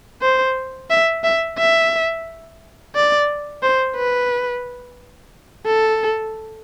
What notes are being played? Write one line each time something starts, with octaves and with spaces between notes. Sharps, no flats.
C5
E5
E5
E5
D5
C5
B4
A4